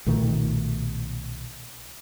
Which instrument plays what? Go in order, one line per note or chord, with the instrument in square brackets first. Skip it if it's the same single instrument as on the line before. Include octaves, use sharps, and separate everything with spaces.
[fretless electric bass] B1 A#2 D#3 A3